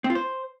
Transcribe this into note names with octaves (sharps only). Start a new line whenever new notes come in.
C4
F4
C5